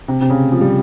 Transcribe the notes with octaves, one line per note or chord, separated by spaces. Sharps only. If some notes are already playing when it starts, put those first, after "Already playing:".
C3
C3
C#3
F3
G3